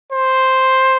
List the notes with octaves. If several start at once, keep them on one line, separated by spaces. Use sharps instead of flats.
C5